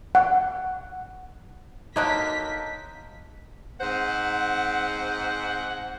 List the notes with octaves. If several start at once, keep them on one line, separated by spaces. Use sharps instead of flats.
F#5
D3 F#3 A#3 D#4 A5 F6 G6 B6
G#2 C4 C5 F#5